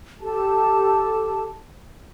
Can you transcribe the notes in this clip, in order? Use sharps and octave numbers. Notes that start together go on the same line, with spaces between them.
G4 A4 A5